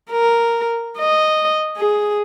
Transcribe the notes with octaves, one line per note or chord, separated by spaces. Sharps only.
A#4
D#5
G#4